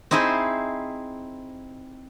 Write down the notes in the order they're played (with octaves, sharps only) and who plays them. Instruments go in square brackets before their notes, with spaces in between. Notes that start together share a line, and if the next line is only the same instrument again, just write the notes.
[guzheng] C4 D#4 E4 G#4 C5